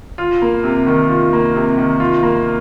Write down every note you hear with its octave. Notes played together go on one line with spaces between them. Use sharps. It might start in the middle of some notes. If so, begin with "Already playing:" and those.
F4
A#3
C3
D#3
F4
A#3
C3
D#3
F4
A#3